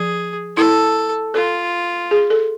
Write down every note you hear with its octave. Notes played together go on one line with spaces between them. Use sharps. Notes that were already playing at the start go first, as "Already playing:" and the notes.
Already playing: F3 G#4
E4 A4
F4 A4
G#4
A4